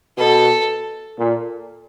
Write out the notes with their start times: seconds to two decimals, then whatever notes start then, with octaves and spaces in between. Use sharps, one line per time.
0.18 B2 A4
1.18 A#2